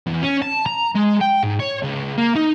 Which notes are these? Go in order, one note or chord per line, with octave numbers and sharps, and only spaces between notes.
E2
C#4
A5
A#5
G#3
G5
G#2
C#5
C#2
A#3
D#4